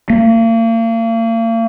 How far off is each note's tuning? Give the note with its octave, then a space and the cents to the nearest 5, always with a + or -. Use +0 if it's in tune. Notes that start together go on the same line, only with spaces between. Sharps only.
A#3 -40